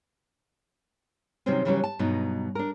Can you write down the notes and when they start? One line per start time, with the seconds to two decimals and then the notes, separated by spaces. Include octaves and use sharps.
1.46 C3 D#3 F#3 G3 C4 C#4
1.65 C#3 E3 F#3 G3 C4 C#4
1.84 A5
1.99 G2 B2 F#3 D#4
2.55 D4 A#4